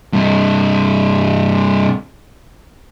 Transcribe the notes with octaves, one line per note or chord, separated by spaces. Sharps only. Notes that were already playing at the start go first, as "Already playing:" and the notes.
G2 C3